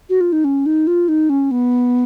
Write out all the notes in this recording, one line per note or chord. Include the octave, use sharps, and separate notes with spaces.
F#4
F4
D#4
C#4
D#4
F4
D#4
C#4
B3